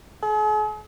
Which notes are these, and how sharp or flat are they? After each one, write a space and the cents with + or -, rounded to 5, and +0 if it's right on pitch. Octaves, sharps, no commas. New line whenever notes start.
G#4 +45